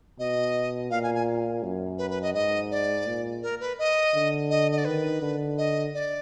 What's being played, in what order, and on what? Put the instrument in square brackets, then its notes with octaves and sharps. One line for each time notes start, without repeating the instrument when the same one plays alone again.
[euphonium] B2 [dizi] D#5
[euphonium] A#2 [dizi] F5
[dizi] G#5
G#5
[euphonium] F#2
[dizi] B4
B4
D#5
[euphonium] G#2 [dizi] D#5
[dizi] D5
[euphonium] A#2
[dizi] A#4
B4
D#5
[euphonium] D3
[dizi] D#5
D#5
D5
[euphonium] D#3 [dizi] B4
[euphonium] D3
[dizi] D#5
D5